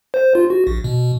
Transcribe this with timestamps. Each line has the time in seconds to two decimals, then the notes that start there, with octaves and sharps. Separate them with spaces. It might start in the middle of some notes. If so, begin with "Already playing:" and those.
0.14 C5
0.35 F4
0.50 F#4
0.67 A#1
0.84 B2